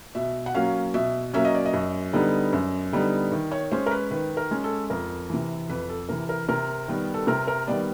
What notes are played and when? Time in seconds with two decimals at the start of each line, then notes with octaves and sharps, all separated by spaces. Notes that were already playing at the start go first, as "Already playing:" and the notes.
0.15 B2 E5
0.46 F#5
0.54 F#3 A#3 C#4 F5
0.94 B2 E5
1.34 F#3 A#3 C#4 E5
1.45 D#5
1.55 D5
1.66 D#5
1.73 F#2
2.13 D3 G3 B3 D#4
2.53 F#2
2.93 D3 G3 B3 D#4
3.32 D#3
3.51 C#5
3.72 G#3 C#4 C5
3.86 A#4
3.91 B4
4.11 D#3 B4
4.37 A#4
4.51 G#3 C#4
4.64 A4
4.90 F2 A#4
5.30 C3 E3
5.69 F2 B4
5.89 A4
6.09 C3 E3 A#4
6.29 A#4
6.49 C3 A#4
6.88 D#3 G3 B3
7.14 A4
7.27 C3 A#4
7.47 A#4
7.67 D#3 G3 B3 D5